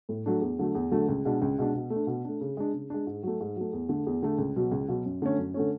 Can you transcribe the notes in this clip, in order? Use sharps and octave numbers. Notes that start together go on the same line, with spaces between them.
A2
F#3 A3 D4
E2
D3 F#3 A3
E2
D3 F#3 A3
C#2
B2 G#3 D4
C#2
B2 G#3 D4
B2
A3
D4
B2
A3 D4
C#3
G#3 D4
C#3
G#3 D4
G#2
F#3 A3
G#2
F#3 A3
E2
D3 A3
E2
D3 A3
C#2
B2 F#3
C#2
B2 F#3
F#2
D3 A3 C#4
F#2
D3 A3 C#4